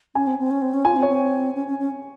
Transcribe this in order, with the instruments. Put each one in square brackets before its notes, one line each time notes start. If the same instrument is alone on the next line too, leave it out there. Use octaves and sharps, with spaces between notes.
[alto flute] C#4 [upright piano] G#5
[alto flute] C4
C4
C#4
C4
C#4
[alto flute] F4 [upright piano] G#5
[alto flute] C4
[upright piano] C#5
[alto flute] C4
C#4
C#4
C#4